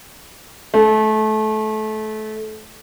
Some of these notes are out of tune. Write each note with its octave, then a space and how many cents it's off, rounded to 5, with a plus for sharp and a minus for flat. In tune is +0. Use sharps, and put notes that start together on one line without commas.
A3 -25